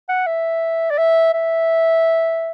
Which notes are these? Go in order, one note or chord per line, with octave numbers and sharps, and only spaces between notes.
F#5
E5
D5
E5
E5